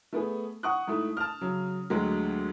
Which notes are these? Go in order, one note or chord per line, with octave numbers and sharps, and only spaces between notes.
A3 B3 G#4
F#5 C#6 D#6 F#6
G#2 A3 E4
A5 F6
C#3 F#3
D2 D3 F#3 G#3 G4